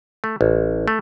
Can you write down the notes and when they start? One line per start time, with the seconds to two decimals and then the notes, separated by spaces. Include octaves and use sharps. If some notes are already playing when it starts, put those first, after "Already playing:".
0.24 A3
0.41 A1
0.88 A3